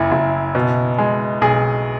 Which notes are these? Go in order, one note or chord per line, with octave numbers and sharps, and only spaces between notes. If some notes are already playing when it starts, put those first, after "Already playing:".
Already playing: F#1 F#2 E4
F#1
B2
G#3
B1 G#4